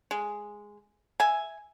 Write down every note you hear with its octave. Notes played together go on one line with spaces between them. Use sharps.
G#3
E5 G#5